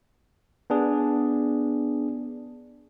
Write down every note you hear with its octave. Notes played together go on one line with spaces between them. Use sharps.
B3 D4 G#4